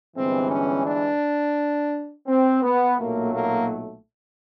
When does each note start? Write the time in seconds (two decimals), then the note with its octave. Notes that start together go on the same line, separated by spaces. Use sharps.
0.15 G1 G2 E3 G#3 C4
0.50 C#4
0.86 D4
2.27 C4
2.62 B3
2.98 B1 A#2 F#3 A3 A#3
3.34 A#3